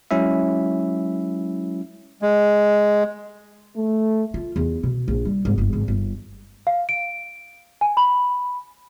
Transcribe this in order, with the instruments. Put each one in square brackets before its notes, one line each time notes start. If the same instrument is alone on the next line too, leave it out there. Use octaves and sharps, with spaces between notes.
[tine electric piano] F#3 G#3 C#4 E4 E5
[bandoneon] G#3
[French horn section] A3
[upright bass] F4
E2
B2
A#1
G3
G#1
G1
G#1
G1
[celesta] F5
D7
G#5
B5